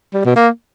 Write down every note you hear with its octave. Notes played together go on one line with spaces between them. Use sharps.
G3
B2
A#3